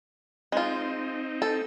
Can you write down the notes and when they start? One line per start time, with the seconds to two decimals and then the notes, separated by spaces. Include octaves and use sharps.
0.52 G#3 C4 D#4 F4
1.42 A4